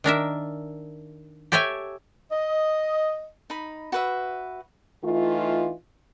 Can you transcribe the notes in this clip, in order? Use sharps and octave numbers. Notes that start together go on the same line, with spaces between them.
D#3 D4 A#4 E5
G4 A4 C#5 E5 G5 G#5
D#5
D#4 B5
F#4 B4 E5
E3 A3 D#4 F4